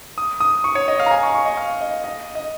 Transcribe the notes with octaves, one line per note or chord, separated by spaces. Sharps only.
D#6
D#6
C#6
C#5
D#5
F5
A#5
G#5
C#6
C#6
D#5
F5
D#5
D#5
D#5